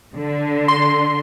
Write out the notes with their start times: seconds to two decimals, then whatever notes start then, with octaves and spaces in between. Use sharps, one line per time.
0.15 D3
0.68 C6